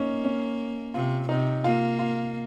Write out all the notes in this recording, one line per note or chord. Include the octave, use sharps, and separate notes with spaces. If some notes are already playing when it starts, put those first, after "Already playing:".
Already playing: A#3 C#4 D#4
C#4
C3 F4
C3 D#4
A#3 F4
F4